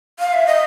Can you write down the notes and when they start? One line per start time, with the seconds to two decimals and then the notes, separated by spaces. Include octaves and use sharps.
0.19 F5
0.33 E5
0.47 D#5